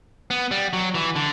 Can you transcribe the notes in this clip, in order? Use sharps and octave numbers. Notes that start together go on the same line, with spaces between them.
B3
G3
F#3
E3
D3